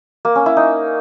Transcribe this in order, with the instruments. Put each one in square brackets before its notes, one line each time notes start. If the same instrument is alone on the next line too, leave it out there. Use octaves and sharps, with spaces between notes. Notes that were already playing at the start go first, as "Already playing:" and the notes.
[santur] A#3
C#4
E4
D#4